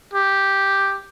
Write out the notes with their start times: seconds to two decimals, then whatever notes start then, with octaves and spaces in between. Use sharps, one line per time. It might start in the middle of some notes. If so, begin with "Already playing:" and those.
0.14 G4